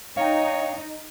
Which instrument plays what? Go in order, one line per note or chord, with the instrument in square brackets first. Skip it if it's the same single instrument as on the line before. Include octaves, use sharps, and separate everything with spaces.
[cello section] D#4 [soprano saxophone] C#5 [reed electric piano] F5 G5